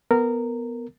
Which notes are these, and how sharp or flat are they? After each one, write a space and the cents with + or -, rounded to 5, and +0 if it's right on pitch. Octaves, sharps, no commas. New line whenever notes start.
B3 +0 A#4 -15